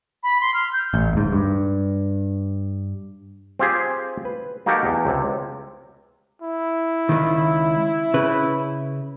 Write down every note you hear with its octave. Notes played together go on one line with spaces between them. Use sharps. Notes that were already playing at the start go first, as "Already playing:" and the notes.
B5
C6
F6
G6
A1
D1 G#2
G2
C4 F4 G4 G#4
B4
A#3 D#4 F#4 G4 A4 A#4
E2
C#2 C3
E4
C#2 D#3
C#3 B4